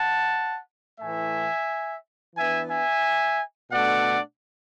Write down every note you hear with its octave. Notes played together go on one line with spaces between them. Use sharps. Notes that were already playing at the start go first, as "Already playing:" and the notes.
Already playing: F#5 A5
A2 E3 A3 E5 G#5
E3 B3 D4 E5 G#5
E5 G#5
B2 A3 D4 D5 F#5